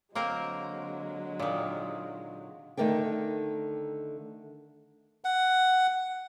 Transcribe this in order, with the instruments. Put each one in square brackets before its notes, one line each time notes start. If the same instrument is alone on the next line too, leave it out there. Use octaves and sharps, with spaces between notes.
[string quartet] D3 F#3 G#3 [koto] A#3 C4 A#4
[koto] A#2 D#3
[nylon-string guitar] D3 D#3 A3 A#4 D5 G5
[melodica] F#5